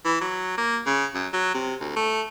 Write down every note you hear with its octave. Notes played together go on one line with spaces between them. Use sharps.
E3
F#3
A#3
C#3
F#2
F#3
C3
D2
A3